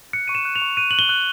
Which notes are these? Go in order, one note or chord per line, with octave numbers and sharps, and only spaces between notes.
F#6 C#7
C#6 D#7
E7
F#6
F7
C#6
F#6 D#7
F#6 F#7
G7
F#6